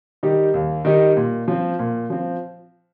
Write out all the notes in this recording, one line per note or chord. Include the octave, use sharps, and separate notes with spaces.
D#3 G3 D#4 G4
D#2
D#3 G3 D#4 G4
A#2
F3 C4
A#2
F3 C4